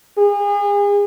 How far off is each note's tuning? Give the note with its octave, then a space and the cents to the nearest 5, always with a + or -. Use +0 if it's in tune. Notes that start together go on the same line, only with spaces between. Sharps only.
G#4 -35